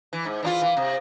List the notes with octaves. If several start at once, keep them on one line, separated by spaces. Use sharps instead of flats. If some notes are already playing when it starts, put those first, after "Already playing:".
E3
G#2
E3 D4 F4
E3
C3